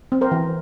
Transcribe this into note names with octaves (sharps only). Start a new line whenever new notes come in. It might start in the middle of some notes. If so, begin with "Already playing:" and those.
C4
A#4 C5
E3